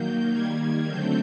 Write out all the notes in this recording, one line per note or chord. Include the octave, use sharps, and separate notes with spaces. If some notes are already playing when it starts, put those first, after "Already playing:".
Already playing: D#3 F#3 A#3 G6
D#3 G3 A#3 G#6
D3 F#3 A3 C4 G6